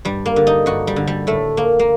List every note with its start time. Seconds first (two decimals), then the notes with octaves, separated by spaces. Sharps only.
0.05 G2 G3
0.26 A#3
0.36 D3
0.47 D#4
0.66 G2 F#4
0.87 G3
0.96 D3
1.07 G3
1.27 A2 A3
1.57 A#3
1.79 A#3